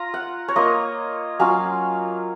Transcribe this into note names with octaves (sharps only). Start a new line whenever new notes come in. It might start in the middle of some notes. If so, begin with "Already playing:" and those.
Already playing: F4 A#5
F#5
C#5
A#3 F4 D#5
F#3 C#4 F4 F5